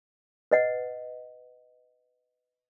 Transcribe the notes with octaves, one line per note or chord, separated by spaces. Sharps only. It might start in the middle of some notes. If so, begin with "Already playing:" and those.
B4 D#5 F#5